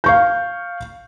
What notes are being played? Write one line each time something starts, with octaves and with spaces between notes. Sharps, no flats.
F5 C#6 G6